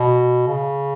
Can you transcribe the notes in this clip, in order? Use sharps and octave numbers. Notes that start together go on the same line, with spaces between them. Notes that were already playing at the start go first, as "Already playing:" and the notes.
Already playing: B2
C#3